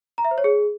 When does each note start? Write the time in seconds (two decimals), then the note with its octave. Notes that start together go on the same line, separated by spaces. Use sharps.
0.18 A#5
0.25 E5
0.31 C5
0.38 C#5
0.44 G#4